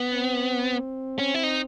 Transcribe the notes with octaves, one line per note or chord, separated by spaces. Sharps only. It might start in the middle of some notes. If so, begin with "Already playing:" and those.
Already playing: B3
C4
C#4
E4
D#4